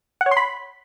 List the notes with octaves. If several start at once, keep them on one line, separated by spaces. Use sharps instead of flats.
F#5
C#5
C6
B5